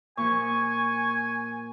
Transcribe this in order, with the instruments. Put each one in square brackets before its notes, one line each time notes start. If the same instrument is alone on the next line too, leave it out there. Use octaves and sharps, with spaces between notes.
[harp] A#2 F3 [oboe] G#5 [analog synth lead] C#6